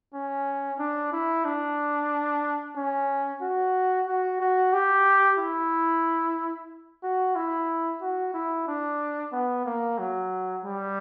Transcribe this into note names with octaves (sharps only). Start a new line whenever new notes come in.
C#4
D4
E4
D4
C#4
F#4
F#4
F#4
G4
E4
F#4
E4
F#4
E4
D4
B3
A#3
F#3
G3